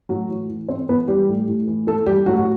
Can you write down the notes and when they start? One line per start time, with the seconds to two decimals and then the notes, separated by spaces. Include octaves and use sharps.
0.09 A2 F#3 F#4
0.29 E3
0.49 E3
0.68 E3 C4 C5
0.89 E3 B3 B4
1.08 E3 G3 G4
1.28 A2
1.48 A2
1.67 E3
1.87 E3 A3 A4
2.06 E3 G3 G4
2.26 A2 F#3 F#4
2.37 F#4